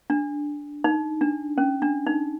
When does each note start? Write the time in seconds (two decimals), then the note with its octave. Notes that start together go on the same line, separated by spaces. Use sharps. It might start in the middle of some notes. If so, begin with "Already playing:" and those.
0.10 D4
0.84 D#4
1.21 D4
1.58 C#4
1.82 D4
2.07 D#4